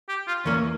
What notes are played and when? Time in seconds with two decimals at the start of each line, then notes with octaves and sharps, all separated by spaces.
0.09 G4
0.27 F4
0.45 E2 E3 A#3 C#4